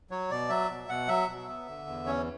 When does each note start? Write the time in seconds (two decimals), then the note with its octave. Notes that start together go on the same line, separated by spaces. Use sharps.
0.10 F#3 C#5
0.30 B2 D5
0.49 F#3 E5
0.69 B2
0.88 B2 F#5
1.08 F#3 E5
1.28 B2
1.48 B3
1.68 D3
1.87 E2
2.06 C#4 C#5